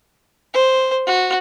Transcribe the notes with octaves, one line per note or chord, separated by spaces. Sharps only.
C5
F#4